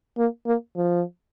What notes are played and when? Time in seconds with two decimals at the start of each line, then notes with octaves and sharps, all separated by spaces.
0.18 A#3
0.46 A#3
0.76 F3